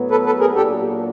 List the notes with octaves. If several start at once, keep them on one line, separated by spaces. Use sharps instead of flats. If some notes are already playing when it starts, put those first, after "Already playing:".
Already playing: A2 F#3 B3
A4 B4
A4 B4
G#4 A#4
A#2 F#3 A#3 D4 G4 A4